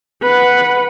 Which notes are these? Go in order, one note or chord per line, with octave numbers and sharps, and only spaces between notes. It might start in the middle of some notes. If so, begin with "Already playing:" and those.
B4 F#5